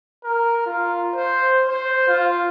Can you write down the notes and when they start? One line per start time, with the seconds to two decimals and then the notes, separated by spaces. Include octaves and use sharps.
0.24 A#4
0.66 F4
1.15 C5
1.69 C5
2.08 F4